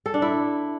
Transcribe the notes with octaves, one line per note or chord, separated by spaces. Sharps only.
A4
D4
E4